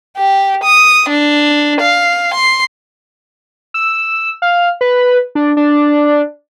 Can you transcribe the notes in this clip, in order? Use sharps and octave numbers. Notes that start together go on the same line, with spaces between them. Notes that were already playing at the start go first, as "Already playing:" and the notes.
G4
D#6
D4
F5
C6
E6
F5
B4
D4
D4